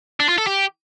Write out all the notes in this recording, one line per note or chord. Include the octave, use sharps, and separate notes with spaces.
D4
F4
A4
G4